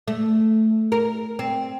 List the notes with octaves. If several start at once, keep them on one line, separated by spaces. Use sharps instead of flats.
A3
A#4
C4